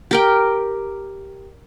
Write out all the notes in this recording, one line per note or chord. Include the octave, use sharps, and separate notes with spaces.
G4 A#4 G5